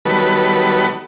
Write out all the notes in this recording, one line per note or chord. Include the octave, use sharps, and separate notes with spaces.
D#3 F#3 G3 B3 A4 B4